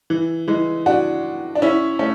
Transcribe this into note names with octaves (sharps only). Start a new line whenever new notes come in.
E3
E3 G#3
D4 F#4
D4
C#4 E4
A3 C#4